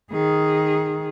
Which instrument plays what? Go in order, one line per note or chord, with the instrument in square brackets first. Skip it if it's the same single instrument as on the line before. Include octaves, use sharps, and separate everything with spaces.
[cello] D#3 G#4